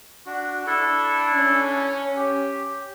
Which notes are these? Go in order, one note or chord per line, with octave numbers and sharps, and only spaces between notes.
D4 F#4
D4 E4 A4
C#4
G4